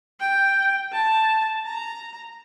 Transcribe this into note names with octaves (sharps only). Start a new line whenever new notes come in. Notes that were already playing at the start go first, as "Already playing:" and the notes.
G5
A5
A#5